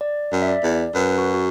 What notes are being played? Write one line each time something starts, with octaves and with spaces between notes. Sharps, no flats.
D5
F#2
E5
D5
E2
F#2 B4
F#4
F#4